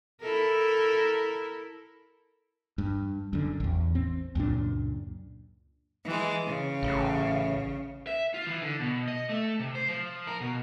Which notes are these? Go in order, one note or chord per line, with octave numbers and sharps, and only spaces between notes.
E4 A4 A#4
G2
F#2 D3
A1 E2
C4
C#2 F#2 A#2 D4
E3 G#3
C#3
A1
E5
F4
E3
D3
B2
D#5
A3
C3
C5
F3
A#4
B2